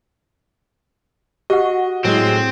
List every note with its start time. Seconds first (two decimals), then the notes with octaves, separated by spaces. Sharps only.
1.50 F#4 G4 D#5 F#5
2.04 A2 F#3 G#3 C4